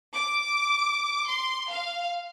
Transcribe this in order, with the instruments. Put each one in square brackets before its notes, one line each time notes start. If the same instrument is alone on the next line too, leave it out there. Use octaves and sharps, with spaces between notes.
[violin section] D6
C6
F5